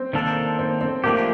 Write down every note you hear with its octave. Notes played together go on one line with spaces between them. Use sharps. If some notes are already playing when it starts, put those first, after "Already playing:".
Already playing: C4
D#3 A#3 D4 A4
C4
C4
F3 A3 A#3 D4 G4